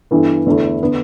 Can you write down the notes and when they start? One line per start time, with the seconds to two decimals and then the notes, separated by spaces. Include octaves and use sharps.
0.11 G2 E3 B3 E4 A4
0.46 E2 D3 A3 E4
0.83 D3 B3